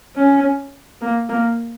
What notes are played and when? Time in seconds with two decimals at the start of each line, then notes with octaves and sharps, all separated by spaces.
0.16 C#4
1.01 A#3
1.29 A#3